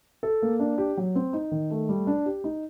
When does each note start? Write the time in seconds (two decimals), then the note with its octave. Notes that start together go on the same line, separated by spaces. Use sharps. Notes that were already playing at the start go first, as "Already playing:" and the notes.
0.23 A4
0.42 A#3
0.60 D4
0.78 G4
0.97 F#3
1.15 C4
1.33 D#4
1.51 D#3
1.71 A3
1.89 G3
2.07 D4
2.26 G4
2.44 D#4